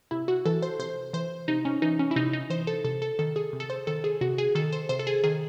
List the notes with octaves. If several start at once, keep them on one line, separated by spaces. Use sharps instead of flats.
C3 E4
F#4
E3 A4
C5
C3 C5
E3 C5
C3 D#4
C#4
E3 D#4
C#4
E4
C3 D#4
D#4
E3 C5
A4
C3 A4
A4
D#3 A4
G#4
C3
A4
C5
D#3 A4
G#4
C3 F#4
G#4
D#3 A4
C5
C3 C5
A4
G#4
D#3 G#4